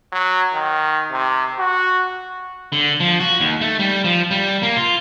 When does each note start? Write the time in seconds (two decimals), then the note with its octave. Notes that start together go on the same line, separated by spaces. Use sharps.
0.12 F#3
0.54 D#3
1.12 C3
1.59 F#4
2.72 D3
3.00 F3
3.20 F#4
3.40 D#2
3.61 A3
3.80 G3
4.05 F3
4.31 G3
4.63 A#3
4.76 F4